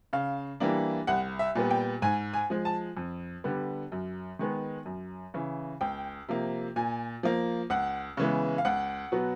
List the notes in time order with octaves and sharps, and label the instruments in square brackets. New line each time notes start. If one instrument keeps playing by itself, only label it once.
[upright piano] C#3 F5
E3 G3 A#3 D4
C2 F#5
E5
A#2 G3 B3
G5
G#2 G#5
G#5
F3 G#3
A5
F2
D3 G3 B3
F#2
D#3 G#3 B3
F#2
C#3 E3
C#2 G5
C3 F3 A#3
A#2 G#5
F3 A#3
C#2 F#5
C#3 E3 G#3 B3
F5
C#2 F#5
B2 F#3 B3